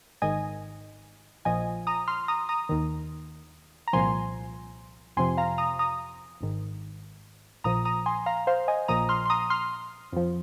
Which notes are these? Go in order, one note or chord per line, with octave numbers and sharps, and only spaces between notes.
G#1 G#2 D#3 D#5 G#5
A#1 A#2 F3 D#5 G#5
A#5 D#6
C6 F6
A#5 D#6
A#5 D#6
D#2 D#3
A#5
C2 A#2 F3 G#5 C6
F2 C3 F3 G#5 C6
F5 A#5
A#5 D#6
A#5 D#6
G#1 G#2 D#3
A#1 A#2 F3 A#5 D#6
A#5 D#6
G#5 C6
F5 A#5
C5 F5
D#5 G#5
A#1 A#2 F3 A#5 D#6
C6 F6
C6
A#5 D#6
C6 F6
F2 F3